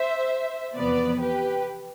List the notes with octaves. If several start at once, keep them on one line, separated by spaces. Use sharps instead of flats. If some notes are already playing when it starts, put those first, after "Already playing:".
Already playing: C5 E5
E2 C3 F3 B3 B4 D5
G4 B4